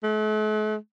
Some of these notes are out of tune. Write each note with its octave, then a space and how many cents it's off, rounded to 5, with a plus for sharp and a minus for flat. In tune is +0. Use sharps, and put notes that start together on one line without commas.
A3 -45